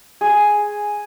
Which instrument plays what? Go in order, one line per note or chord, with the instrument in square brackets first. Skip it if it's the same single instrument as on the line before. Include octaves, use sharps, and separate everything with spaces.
[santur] G#4